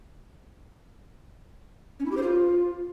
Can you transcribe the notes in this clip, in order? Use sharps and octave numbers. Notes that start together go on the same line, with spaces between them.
C#4
E4
G4
C5
F4